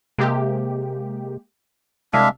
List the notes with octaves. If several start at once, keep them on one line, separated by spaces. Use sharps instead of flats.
C3 G#3 A#3 G4
C2 G#3 D4 E5 F5